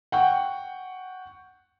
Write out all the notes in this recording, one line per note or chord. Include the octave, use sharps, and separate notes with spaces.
F#5 G5 C#6